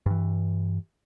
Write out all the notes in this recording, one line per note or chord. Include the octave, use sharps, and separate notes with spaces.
G2 E3